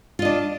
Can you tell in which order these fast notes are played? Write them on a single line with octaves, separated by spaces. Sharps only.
F4 D#5 D4